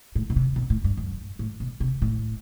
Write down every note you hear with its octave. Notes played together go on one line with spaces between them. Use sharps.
A2
B2
C3
B2
A2
G2
F#2
A2
B2
C3
A2